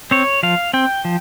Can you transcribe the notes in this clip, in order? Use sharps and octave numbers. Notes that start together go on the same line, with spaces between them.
C4 C#5
F3 F5
C4 G5
F3